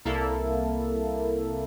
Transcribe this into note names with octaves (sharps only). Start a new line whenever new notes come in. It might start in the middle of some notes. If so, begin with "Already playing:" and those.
C2 A#3 E4 A4